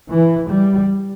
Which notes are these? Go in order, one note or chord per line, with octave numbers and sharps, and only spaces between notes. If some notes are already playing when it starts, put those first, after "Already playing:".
E3
G3